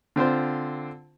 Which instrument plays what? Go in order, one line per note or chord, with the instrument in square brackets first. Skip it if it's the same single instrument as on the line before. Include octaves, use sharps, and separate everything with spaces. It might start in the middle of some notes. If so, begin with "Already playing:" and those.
[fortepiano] D3 C4 F4 C5